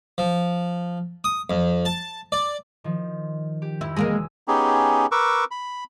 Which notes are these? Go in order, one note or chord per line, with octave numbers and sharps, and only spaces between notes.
F3
D#6
F2
A5
D5
D#3 F3
G4
F2 E4
E1 G#3 A#3 G#4 A#4 E6
B3 C#4 D#4 G4 G#4
A#4 B4 C#6 D6 E6
B5